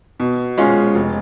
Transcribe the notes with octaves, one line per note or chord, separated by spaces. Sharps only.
B2
G#3 C#4 F4
F1